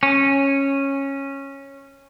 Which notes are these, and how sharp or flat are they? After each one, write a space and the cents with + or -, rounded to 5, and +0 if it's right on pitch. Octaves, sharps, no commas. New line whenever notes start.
C#4 -10